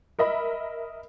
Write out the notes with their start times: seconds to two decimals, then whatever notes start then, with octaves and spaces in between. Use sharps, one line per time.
0.19 A#4 D#5 E5 B5